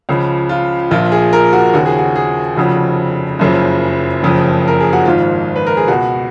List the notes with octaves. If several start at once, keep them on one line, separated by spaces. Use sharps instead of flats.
C#2 C#3 F3
F4
A#1 A#2 F3 F4
G#4
A#4
F#4
D#2 C#3 F3 F#4
G#4
F#4
G#4
F1 F2 C#3 F3 F#4
F#1 F#2 C#3 F3
F#1 F2 C#3 F3
A#4
G#4
F#4
G#1 G#2 F3 F4
B4
A#4
G#4
C#2 B2 F#4